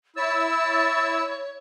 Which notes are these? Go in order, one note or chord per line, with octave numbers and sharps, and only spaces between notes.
E4 C#5 E6 A6